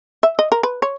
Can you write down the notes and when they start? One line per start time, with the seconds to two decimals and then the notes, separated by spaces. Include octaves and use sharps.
0.23 E5
0.39 D#5
0.52 A#4
0.63 B4
0.82 C#5